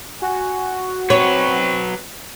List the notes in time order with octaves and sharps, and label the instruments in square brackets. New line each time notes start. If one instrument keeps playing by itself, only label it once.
[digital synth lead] F#4 [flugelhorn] G#5
[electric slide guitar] F#3 B4 [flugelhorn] C4 [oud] C#5